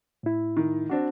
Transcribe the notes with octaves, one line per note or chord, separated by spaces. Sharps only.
A2 E4
D#3
C4 D4 F#4